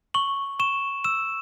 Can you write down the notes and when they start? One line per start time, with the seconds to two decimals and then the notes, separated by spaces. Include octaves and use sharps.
0.14 C#6 F#7
0.60 C#6 E7
1.04 E6 E7